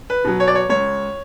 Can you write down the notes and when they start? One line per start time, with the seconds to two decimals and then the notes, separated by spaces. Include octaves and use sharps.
0.10 B4
0.25 B2 F#3
0.40 C#5
0.47 D5
0.55 C#5
0.69 C#2 C#5